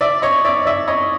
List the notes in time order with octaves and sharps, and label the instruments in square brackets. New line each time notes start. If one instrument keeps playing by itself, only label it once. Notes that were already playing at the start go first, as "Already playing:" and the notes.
[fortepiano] D5 E5
C#5 D#5
D5 E5
D5 E5
C#5 D#5